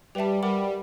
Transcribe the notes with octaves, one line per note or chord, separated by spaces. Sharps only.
G3 G4 B4 E5 A5
G3 A#4 D5 F#5 B5 D6